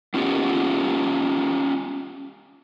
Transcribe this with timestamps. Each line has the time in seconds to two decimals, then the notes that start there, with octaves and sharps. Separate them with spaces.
0.14 B3 C#4 F4 G4 D#5 F#5